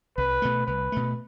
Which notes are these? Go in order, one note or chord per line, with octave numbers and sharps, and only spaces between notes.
C2 B4
B2 A3
C2 B4
B2 A3